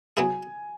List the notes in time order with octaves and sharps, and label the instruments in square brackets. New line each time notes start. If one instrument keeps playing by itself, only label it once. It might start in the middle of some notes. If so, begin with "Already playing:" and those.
[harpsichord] F#3 B3 E4 G#4 [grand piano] G#5